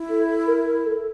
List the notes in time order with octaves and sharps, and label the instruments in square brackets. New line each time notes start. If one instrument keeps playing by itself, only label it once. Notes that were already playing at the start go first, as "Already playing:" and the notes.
Already playing: [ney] E4
[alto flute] A4
A#4
A#4
A4